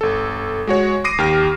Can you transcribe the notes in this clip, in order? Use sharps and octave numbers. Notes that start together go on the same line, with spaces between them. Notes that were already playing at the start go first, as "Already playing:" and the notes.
G1 A4
G#3 F#4 C#5
D6 D#6 A#6 C7 D7 D#7
D#2 G4 F6